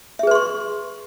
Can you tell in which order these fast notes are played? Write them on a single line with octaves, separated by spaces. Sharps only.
E5 G#4 B4 C6 C#6